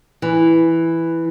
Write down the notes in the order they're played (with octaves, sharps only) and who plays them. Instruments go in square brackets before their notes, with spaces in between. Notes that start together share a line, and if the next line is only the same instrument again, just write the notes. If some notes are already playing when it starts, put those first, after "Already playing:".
[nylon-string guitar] E3